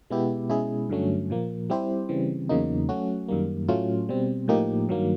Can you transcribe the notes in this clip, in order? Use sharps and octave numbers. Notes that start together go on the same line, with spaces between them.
B2 G#3 B3 E4 G4
B2 G#3 C#4 E4 G#4
G2 D3 F#3 A3 C#4
A#2 F3 A#3
G3 C4 E4 G4 C5
C#3 E3 G3 C4
E2 C#3 F#3 A#3 D#4
F#3 A3 C#4 F#4
F#2 D#3 G3 A#3
A2 F#3 A3 C#4 F4
B2 G3 C4
A2 F3 A#3 D#4 G4
G2 D#3 F#3 A#3